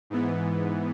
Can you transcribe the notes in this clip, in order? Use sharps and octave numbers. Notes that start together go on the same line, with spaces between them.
G#2 E3 B3